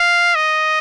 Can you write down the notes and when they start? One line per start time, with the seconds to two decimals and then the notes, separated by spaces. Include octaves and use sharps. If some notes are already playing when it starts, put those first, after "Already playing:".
Already playing: F5
0.35 D#5